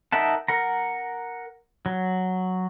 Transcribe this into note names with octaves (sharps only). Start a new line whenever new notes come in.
D#4 A#4 E5 F#5 A5
A#4 F#5 A#5
F#3